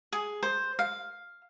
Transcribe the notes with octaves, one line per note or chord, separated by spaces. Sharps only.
G#4
C5
F5